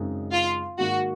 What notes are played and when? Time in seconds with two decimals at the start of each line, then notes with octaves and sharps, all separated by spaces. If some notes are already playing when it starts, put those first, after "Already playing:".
Already playing: F#2 C#3 G#3 C4 D#4
0.32 F4
0.78 G#2 D#3 A#3 D#4 F#4